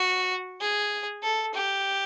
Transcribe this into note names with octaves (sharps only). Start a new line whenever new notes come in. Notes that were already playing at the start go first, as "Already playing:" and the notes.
Already playing: F#4
G#4
A4
G4